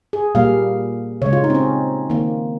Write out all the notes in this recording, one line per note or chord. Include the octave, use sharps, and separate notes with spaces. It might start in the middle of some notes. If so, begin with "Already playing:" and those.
G#4
A#2 G3 A#3 F5
C#3 G#3 C#5
F4
D#4
C4
C#4
D#3 A#3